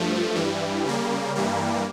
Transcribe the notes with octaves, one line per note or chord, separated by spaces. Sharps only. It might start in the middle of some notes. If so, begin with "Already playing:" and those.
Already playing: G2 F3 A3
G2 E3 G3
C#3 G3 A#3
G2 E3 G3 A#3